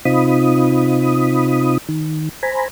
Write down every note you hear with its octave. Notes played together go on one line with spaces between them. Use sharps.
C3 C4 D#4 F4 B5 D#6
D#3
C5 G#5 A#5 B5